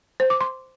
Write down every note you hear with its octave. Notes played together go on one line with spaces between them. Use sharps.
C5
D6
C6